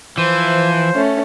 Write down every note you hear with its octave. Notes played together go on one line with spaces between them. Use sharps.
E3 F3 C5
A3 C#4